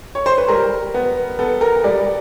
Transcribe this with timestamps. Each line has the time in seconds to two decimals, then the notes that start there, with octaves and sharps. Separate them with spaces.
0.15 C#5
0.26 C5
0.38 B4
0.48 G3 A#4
0.94 B3
1.39 B3 A4
1.61 A#4
1.84 G3 D5